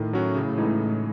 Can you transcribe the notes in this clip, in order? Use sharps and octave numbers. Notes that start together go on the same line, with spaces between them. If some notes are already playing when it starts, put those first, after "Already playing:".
Already playing: A2 D#3
F#3 C#4 F#4
C#3
E3 G#3 D#4 G#4